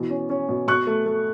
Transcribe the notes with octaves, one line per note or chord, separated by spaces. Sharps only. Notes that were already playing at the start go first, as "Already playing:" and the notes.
Already playing: B2 E3
C#4
C#4
B2
B2 C#6 F#6
A3
A3